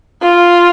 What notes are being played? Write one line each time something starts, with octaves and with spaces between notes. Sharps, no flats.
F4